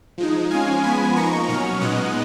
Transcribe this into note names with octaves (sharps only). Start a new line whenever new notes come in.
F3 G#3 D#4
F3 G#3 C#4 F5 G#5
F3 G#3 B3 G#5 B5
F3 A#3 D#4 A#5 C#6
B2 F#3 C#4 C#6 F6
A#2 G#3 B3 D#4 D#6 F#6